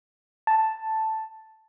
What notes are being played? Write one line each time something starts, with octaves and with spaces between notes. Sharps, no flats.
A5